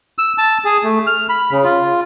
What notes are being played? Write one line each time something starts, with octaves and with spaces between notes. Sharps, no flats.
E6
A5
G#4
A3
F6
B5
C#3
F4